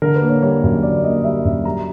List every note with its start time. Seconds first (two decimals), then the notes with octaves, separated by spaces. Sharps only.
0.02 D3 A#4
0.15 B4
0.22 A#3
0.29 C#5
0.42 G3 C#5
0.63 F#2
0.83 D3 D5
1.04 A#3 D#5
1.24 G3 E5
1.45 F#2
1.65 G3 A#5